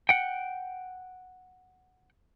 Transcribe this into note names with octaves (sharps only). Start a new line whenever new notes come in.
F#5 G5